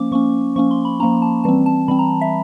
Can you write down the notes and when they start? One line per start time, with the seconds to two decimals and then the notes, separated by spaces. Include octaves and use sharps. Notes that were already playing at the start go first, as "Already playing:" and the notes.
Already playing: F3 A#3 C#4 D6
0.12 F3 A#3 C#4 C#6
0.56 F3 A#3 C#4 C#6
0.71 C6
0.85 B5
1.00 C#4 A#5
1.03 F3 A#3
1.22 A5
1.44 E3 G3 C4 A5
1.66 A5
1.88 E3 G3 C4 B5
1.99 A#5
2.21 E5